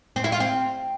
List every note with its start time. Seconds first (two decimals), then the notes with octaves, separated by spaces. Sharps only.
0.16 C4
0.24 E4
0.32 F4
0.40 C4